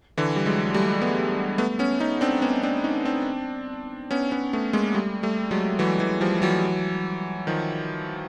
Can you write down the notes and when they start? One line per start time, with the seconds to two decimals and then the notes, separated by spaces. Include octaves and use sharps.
0.17 D3 E3
0.36 G3
0.46 F#3 G#3
0.74 G3 A3
1.02 A3 B3
1.58 A3 B3
1.79 B3 C#4
2.00 C#4 D#4
2.21 C4 D4
2.42 B3 C#4
2.63 C4 D4
2.84 C#4 D#4
3.05 C4 D4
4.11 B3 C#4
4.32 B3 C#4
4.53 A3 B3
4.73 G#3 A#3
4.94 G3 A3
5.23 G3 A3
5.51 F#3 G#3
5.79 E3 F#3
6.00 E3 F#3
6.21 F3 G3
6.42 E3 F#3
7.47 D#3 F3